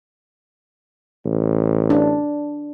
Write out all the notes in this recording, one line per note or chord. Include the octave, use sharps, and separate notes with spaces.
A1
D4